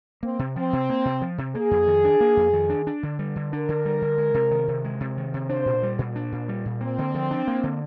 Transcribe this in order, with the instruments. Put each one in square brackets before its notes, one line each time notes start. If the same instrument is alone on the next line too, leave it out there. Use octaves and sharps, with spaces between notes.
[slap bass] A#3 [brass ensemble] C4
[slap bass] C3
[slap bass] F3 [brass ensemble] C4
[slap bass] C3
A#3
C3
F3
C3
[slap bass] A#3 [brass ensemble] G#4
[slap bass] F2
D#3
D4
A#3
F2
D#3
D4
D4
D3
G3
D3
[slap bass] D4 [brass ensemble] A#4
[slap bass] D3
G3
D3
G#3
C3
D#3
C3
G#3
C3
D#3
C3
[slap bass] D4 [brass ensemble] C5
[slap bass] A#2
G3
A#2
D4
A#2
G3
A#2
[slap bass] A#3 [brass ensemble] C4
[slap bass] D3
F3
D4
A#3
D3